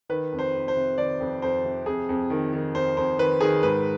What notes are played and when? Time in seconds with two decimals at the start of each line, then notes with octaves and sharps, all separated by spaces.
0.09 D#3 B4
0.32 F2
0.39 C5
0.54 F2
0.68 C5
0.76 C3
0.98 D#3 D5
1.20 F2
1.42 F2 C5
1.64 C3
1.86 F2 G#4
2.09 F2
2.30 D#3
2.53 D#3
2.75 F2 C5
2.97 F2 C5
3.19 D#3 B4
3.41 D#3 G#4
3.63 G#2 B4